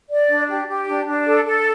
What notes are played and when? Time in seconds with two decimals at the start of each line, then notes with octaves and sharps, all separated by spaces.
0.10 D5
0.29 D4
0.48 G4
0.67 G4
0.87 D4
1.06 D4
1.26 A4
1.45 A4